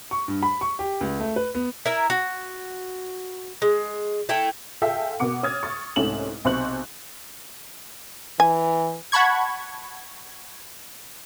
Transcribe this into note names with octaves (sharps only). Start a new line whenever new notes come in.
C#6
G2
B5
C#6
G4
C#2
A3
B4
B3
E4 A#4 E5
F#4
G#3
A3 E4 G5
F4 G#4 A4 E5 F5 G5
B2 A#4 F#5 D6 C#7
C#5 D#6 F6 G#6 A6
C#6 A6
C2 G#2 A3 C#4 E7 F#7
B1 C3 C5 C#6 F#6 F#7
E3 G#5
F#5 A5 B5 C#6 G#6